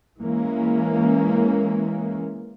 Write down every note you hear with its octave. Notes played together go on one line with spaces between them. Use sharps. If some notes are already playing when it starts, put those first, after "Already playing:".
E3 G#3 A#3 C#4